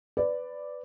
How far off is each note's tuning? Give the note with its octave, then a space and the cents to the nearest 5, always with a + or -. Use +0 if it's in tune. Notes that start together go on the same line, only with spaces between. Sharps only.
B4 +15 D5 +0